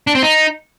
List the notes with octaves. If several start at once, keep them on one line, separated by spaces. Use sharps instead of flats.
D4
C4
D#4